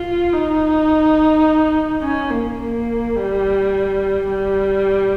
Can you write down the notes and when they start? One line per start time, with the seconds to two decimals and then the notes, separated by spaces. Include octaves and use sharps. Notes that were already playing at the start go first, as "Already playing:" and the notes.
Already playing: F4
0.32 D#4
2.02 C#4
2.30 A#3
2.59 A#3
3.15 G3
4.28 G3